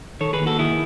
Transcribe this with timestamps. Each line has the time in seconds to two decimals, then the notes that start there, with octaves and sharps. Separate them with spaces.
0.21 D#3 A4 C#5
0.33 G#4 B4
0.40 D#2
0.46 F#4 A4
0.59 D#3 E4 G#4